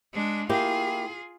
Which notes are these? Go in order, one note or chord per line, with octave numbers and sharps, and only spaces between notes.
G#3 D4
A#3 E4 F4 G4 G#4